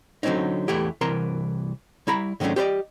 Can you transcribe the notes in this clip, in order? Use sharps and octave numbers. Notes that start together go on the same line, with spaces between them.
D3 F#3 G#3 C4 C#4 D#4
E2 E3 A3 E4 G4
C2 E3 A#4 A5 A#5 C6
G3 E4 A#5 B5
G#2 D#3 F#3 A3 C#4 D4
G4 B4 C5 D5 D#5